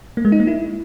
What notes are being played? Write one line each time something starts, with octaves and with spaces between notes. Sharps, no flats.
A#3
G#3
D#4
A#3
E4